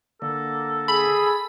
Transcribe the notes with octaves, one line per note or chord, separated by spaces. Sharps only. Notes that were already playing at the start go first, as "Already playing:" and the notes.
D3 A#3 A4
G#4 B5